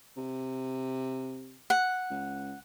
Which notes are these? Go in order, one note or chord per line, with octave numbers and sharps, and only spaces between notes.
C3
F#5
C#2